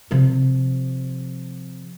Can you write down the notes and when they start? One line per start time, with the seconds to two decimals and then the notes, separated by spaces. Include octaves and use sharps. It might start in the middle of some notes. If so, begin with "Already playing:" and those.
0.11 C3 F3